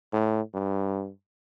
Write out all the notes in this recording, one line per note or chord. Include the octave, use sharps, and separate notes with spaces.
A2
G2